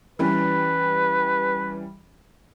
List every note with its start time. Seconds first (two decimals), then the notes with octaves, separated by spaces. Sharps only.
0.19 E3 G3 C#4 B4